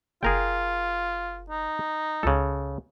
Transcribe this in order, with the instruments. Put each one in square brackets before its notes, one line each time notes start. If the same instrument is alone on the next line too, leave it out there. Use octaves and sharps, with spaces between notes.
[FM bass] F#1 [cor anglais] F4 [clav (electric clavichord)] G#4 A#4 G5
[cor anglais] D#4
[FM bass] C#2 [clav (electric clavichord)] C#3 A4